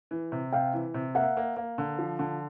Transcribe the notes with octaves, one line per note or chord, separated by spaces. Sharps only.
E3
C3
C3 F5 G5
E3
C3
A#3 E5 F#5
A#3
A#3
D3
F3
D3